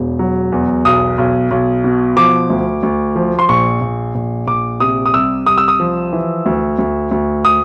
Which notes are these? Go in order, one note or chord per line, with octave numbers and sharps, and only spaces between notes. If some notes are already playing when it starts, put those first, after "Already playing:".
Already playing: E1 E2
F#3
E2
B1 D#6
B1
B1
B2
F3 D6
D2
D2
F3
C6
A#1 C#6
A#1
A#1
A#1 D6
C3 D#6
D#6
C2 E6
C2 D#6
E6
D#6
F3
E3
D2
D2
D2
D#6